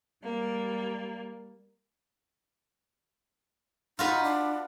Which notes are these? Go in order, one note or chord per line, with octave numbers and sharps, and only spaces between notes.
G3 A#3
D#4 F4 F#4 B4
D4